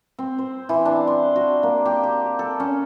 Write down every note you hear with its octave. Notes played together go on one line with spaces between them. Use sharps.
C4
C5
E3
D4
C6
F#4
A#3
G4
G4
A4
C#4